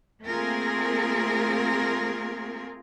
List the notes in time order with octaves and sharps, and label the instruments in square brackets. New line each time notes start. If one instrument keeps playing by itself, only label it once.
[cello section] A3 A#3 C4 F4 G#4 A#4